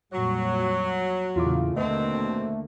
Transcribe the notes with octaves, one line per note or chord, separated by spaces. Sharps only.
F2 A#2 F#3 G3 C#6
E2 A#2 C#3 A3 E4 F4 D6
D#2 B2 D3 A3 A#3 C4 D#5